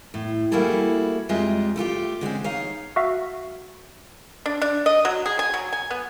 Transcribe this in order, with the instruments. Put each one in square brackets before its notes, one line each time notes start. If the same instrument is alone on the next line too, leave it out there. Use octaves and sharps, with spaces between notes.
[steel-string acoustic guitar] A2
G3 A#3 E4 F#4 G#4 A4
F2 G3 G#3 F4 D#5 E5
A3 E4 F4 G4
D3 G#3 C4 C#4
D#4 C#5 F5
[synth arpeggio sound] F#4 E5 F5
[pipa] D4
D4
D#5
F#3
G#4
G#5
F#3
G#5
B3